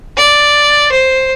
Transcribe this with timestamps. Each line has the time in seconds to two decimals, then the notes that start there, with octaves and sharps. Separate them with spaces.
0.17 D5
0.91 C5